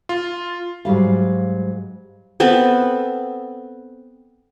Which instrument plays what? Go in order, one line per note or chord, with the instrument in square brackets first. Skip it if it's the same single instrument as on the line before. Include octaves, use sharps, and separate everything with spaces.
[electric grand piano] F4
[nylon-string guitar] G#2 F#3 G3 F5
[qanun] B3 C4 A4 B4